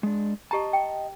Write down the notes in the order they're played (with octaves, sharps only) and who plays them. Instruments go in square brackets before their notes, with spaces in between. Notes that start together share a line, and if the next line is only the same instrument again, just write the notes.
[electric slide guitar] G#3 D4
[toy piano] G4 A#5 [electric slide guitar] D#5 A5
[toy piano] G5